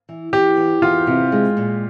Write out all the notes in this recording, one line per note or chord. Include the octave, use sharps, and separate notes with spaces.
E3
E3 G4
E2
E2 F4
C3
G#3
A#2